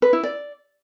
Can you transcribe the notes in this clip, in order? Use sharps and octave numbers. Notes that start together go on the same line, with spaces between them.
B4
E4
D5